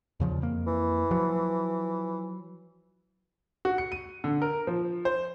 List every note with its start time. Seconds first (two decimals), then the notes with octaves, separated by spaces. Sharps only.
0.20 E2 C#3 F3
0.42 F2 A#3
0.67 E3
1.11 F3 F#3
3.65 F#4
3.78 C#7
3.92 D#7
4.24 D3
4.42 A#4
4.67 F3
5.05 C5